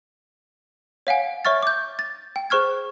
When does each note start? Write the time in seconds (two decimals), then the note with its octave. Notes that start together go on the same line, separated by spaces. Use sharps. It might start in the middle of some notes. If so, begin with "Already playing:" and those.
1.07 C#5 F5 F#5 G#5
1.45 C#5 E5 C#6 F6 A6
1.63 D6 G6
1.99 A6
2.36 G5
2.50 G#4 C5 C#6 F6 G#6